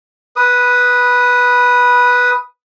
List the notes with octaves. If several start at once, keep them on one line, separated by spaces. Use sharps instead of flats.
B4 D#6